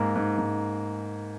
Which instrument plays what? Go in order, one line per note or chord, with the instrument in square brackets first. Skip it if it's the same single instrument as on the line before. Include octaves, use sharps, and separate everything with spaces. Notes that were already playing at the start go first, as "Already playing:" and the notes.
Already playing: [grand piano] G#2 A#3
G#2
G#2